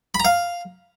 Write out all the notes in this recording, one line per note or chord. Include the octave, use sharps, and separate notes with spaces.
B5
A#5
F5